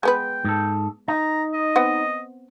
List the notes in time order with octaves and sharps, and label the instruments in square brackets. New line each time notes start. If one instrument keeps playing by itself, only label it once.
[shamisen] G#3 B3 B4 [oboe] G5
[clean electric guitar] G#2 A4
[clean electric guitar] D#4 [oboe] A#5
[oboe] D#5
[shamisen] B3 C4 F#5